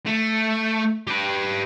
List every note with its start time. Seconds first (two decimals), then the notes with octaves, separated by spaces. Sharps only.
0.06 A3
1.07 G4 B4